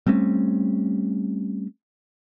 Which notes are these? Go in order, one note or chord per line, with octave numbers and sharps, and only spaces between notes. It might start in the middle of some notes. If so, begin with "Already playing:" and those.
G3 A3 C4 C#4